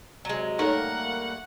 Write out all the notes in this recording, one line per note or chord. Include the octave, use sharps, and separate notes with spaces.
C3 F#3 G#3
G3 A3 A#3 D#4 A4 A#4 C#5 F#5